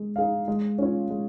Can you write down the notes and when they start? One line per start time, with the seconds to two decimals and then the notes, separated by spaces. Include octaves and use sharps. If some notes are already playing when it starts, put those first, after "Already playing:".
Already playing: G#3
0.16 D#4 G#4 F5
0.48 G#3
0.78 C#4 F4 C#5
1.10 G#3